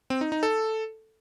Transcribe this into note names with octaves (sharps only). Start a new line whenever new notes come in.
C4
D#4
D#4
A4